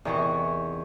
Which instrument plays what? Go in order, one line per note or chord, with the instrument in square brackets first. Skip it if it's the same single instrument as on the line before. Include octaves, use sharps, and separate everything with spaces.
[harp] E2 C#6 [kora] C3 D#3 E3